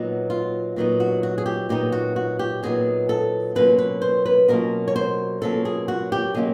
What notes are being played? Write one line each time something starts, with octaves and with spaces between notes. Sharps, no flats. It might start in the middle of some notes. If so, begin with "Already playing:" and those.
Already playing: A#2 F#3 B3 D#4
F4
A#2 F#3 B3 D#4
F#4
F#4
G#4
G4
A#2 F#3 B3 D#4 G4
F#4
F#4
G4
A#2 F#3 B3 D#4 G#4
A4
B2 F#3 A#3 C#4 F4 B4
B4
C5
B4
B2 F#3 A#3 C#4 F4 A#4
C#5
C5
B2 F#3 A#3 C#4 F4 A4
G#4
F#4
G4
B2 F#3 A#3 C#4 F4 G#4